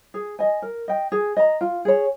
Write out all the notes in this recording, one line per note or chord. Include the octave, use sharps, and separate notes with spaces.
G#4
D#5 G#5
A#4
D#5 G5
G#4
D#5 A#5
F4
G#4 C#5